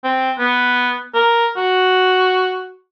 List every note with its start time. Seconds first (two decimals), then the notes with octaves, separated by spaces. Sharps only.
0.04 C4
0.39 B3
1.15 A#4
1.57 F#4